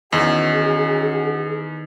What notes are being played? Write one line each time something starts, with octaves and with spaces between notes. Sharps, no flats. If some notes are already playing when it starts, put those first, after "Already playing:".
E2 D#3 C#4 F#4 G#4 F#5